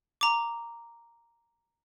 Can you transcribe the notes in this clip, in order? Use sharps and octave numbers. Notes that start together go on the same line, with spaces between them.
A#5 D6